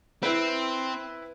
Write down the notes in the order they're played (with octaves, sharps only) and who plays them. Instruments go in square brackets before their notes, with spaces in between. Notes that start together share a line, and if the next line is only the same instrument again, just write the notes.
[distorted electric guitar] C4 [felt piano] E4 B4